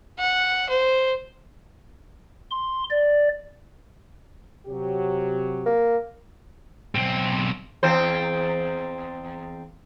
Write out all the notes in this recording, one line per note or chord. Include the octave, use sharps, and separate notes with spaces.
F#5
C5
C6
D5
C3 F#3 G4
A#3
B1 C4
E2 C4 C5